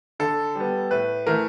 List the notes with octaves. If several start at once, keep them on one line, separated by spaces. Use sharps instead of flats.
D3 A4
G3 B3
A2 B4
E3 A3 A#4